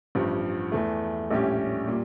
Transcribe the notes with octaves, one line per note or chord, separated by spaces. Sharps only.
A1 G2 F3
E2 E3 A3
A#1 A2 G3 C#4 G4
A#2 G3